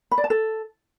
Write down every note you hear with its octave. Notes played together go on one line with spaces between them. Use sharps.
B5
D5
A5
A4